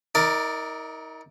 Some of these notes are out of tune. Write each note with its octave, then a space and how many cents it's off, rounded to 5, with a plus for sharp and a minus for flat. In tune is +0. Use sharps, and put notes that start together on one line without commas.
D#4 +40 A#4 +0 D5 +10